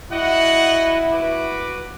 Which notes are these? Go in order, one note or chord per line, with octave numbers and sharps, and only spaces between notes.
E4 F#4 D#5 F#5
F#4 B4 D6